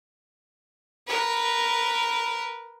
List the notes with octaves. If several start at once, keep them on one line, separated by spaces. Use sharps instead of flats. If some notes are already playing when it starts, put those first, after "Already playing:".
A#4 B4